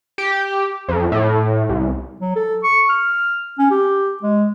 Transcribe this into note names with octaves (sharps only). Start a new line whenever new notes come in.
G4
F2
A2
C2
F#3
A4
C#6
F6
C#4
G4
G#3